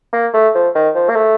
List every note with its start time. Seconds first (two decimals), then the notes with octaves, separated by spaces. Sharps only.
0.13 A#3
0.34 A3
0.55 F3
0.75 D#3
0.95 F3
1.09 A#3
1.16 A3